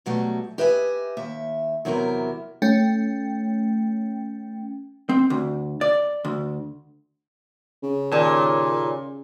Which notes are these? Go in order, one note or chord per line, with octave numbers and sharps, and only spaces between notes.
B2 F#3 G3 A3
G4 B4 D#5 E5 F#5 G#5
D#2 E5
E2 C3 F#3 E4 G4 A#4
A3 C#4 G5
C4
D2
D5
D2
C#3
D#2 A#2